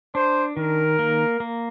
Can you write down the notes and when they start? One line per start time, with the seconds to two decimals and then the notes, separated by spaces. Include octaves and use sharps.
0.15 D4 C5
0.57 D#3 A#4
0.99 A#3
1.40 A#3